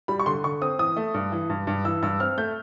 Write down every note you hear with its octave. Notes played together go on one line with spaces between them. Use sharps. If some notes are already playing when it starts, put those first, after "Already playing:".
G3 B5
C#6
D3 C6
D3 C#6
C4 D#6
E3 D#6
A3
G2
E3
G2
G2
E3 E6
G2 E6
C4 F6
A3 G6